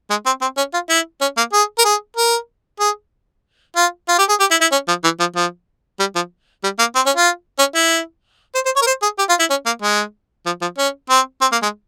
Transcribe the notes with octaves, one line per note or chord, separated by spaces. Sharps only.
G#3
C4
C4
C#4
F4
E4
C#4
A#3
G#4
A#4
G#4
A#4
G#4
F4
F4
G4
G#4
G4
E4
E4
C#4
F3
E3
F3
F3
G3
F3
G3
A#3
C4
C#4
F4
C#4
E4
C5
C5
C#5
A#4
C5
G#4
G4
F4
E4
C#4
A#3
G#3
F3
F3
C#4
C4
C4
A#3
G#3